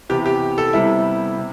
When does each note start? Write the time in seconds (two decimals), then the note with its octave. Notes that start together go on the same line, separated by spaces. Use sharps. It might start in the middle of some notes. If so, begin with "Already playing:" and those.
0.09 C3 E3 B3 G4
0.26 G4
0.58 A4
0.73 C3 G3 B3 E4
1.37 C3